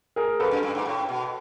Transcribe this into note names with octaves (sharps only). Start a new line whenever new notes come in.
G#4 A#4
F2 A4 B4
F#2
G2
G#2
A2
B2